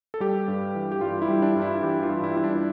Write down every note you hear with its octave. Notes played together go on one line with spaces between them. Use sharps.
A4
G3 G4
G2
E3
G4
G2 F4
E4
G3
D4
G2 F4
E4
E3 G4
F4
G2
E4
G3 E4
D4